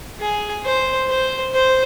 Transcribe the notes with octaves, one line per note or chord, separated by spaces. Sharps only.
G#4
C5
C5
C5